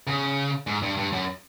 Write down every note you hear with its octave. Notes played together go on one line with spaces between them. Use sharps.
C#3
G#2
G2
G2
F#2